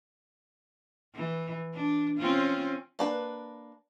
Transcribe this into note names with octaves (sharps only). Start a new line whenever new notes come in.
E3
D4
C4 C#4 F4
A#3 D4 B4